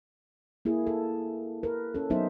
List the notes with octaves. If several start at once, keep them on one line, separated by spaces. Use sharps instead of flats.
A#3 E4 G#4
A4
A#4 B4
C#4 A4
F#3 B3 D#4 C5 E5